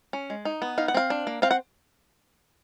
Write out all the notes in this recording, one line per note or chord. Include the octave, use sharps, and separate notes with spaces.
C#4
G#3
D#4
B3
D#4 F5
F#5
C4 F5
D4
A#3
C4 F5
F#5